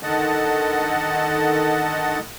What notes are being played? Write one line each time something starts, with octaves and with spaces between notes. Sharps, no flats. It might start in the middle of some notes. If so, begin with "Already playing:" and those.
D3 D#3 D#5 F#5 A5